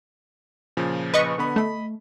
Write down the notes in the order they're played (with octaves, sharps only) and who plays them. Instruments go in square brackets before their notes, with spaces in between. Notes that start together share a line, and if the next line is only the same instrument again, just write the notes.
[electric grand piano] A#2 C#3 F3
[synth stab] B4 D#5 C#6
[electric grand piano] D3 B3 B5
[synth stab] A3 [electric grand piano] D#5 B5